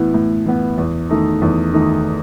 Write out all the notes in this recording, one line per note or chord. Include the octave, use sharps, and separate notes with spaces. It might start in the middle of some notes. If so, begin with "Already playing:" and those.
Already playing: A2 E3 B3
A2
E3 B3
E2
D#3 A3 D#4
E2
D#3 A3 D#4